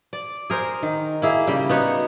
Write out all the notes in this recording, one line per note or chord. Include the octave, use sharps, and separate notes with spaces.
D5
G#4 A#4 C5
D#3
A#3 E4 G#4
C#3 G3
B3 D#4 F#4 C#5